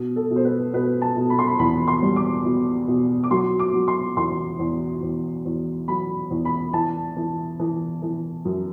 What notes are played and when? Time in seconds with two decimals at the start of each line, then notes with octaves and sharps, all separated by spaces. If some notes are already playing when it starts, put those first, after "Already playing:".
Already playing: B2
0.16 A4
0.30 B2
0.36 C5
0.45 B4
0.73 B2 B4
1.02 A5
1.16 B2
1.30 B5
1.39 C6
1.47 B5
1.59 E2 B5
1.88 C6
2.02 G3
2.16 D6
2.45 B2
2.88 B2
3.24 D6
3.31 F#3 C6
3.59 D6
3.74 F#3
3.88 C6
4.17 E2 C6
4.59 E2
5.03 E2
5.45 E2
5.88 F#3 B5
6.31 E2
6.45 B5
6.73 E3 A5
7.17 E3
7.60 E3
8.02 E3
8.45 F#2